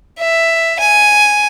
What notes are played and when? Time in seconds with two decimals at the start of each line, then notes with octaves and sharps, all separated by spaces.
0.19 E5
0.79 G#5